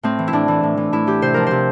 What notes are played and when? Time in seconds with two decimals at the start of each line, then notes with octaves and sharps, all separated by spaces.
0.03 A2 C4
0.19 E3
0.28 E4
0.33 A2 D4
0.48 E3
0.63 A2
0.77 E3
0.92 A2 E4
1.07 E3 G4
1.22 C3 C5
1.34 F3 A#4
1.47 C3 C5